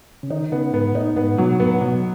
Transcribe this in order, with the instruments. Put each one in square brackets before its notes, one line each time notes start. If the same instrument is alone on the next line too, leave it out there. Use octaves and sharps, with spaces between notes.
[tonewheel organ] C#3
[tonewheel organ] D#3 [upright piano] D#4
[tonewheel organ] C#3 [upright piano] B3
[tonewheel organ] G#2 [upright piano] B3
[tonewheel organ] A2 [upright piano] D#4
[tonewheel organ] G#2 [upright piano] B3
[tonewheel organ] B2 [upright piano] F#3
[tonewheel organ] A2 [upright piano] B3
[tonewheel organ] A2
[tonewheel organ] B2 [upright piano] F#3